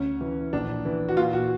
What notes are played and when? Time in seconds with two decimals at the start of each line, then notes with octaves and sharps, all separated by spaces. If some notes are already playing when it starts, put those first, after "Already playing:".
Already playing: D2 C#4
0.21 E3
0.53 A#1 D4
0.85 E3
1.09 F#4
1.17 A#2 F4
1.33 F#4